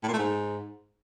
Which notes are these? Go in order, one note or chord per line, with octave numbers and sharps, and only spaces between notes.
A2
A#2
A3
G#2